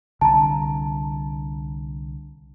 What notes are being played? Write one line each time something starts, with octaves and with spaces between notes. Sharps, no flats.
C2 D3 A5 A#5